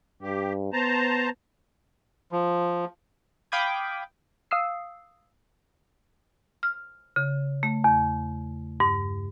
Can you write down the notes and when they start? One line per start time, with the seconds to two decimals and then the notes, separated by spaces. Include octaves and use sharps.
0.23 G2 G4
0.73 B3 C5 A5 A#5
2.32 F3
3.52 F5 G5 B5 D6 D#6 G#6
4.51 F5 D#6 E6 C7
6.63 F6
7.16 C#3
7.63 A3
7.84 E2
8.80 G2